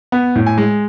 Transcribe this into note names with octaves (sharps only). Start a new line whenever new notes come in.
B3
A2
G#5
G#3